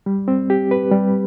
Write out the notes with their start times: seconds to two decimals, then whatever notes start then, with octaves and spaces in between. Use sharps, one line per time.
0.06 G3
0.28 C4
0.50 G4
0.71 B4
0.91 G3